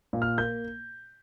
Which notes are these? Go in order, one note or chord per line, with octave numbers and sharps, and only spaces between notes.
A#2
F6
A#3 G6